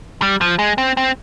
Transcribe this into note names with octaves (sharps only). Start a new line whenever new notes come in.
G3
F3
G#3
C4
C4